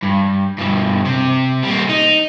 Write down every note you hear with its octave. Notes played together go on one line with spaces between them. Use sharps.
G2
G2 B2
C3
G3 A#3
D#4